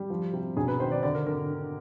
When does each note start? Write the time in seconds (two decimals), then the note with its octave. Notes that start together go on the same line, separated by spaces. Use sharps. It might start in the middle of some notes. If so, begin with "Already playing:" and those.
Already playing: G3
0.10 F3
0.33 C3
0.57 E1 G#4
0.68 B4
0.79 D#3 C5
0.92 D5
1.03 D3 D5
1.15 A#4
1.26 D3 A#4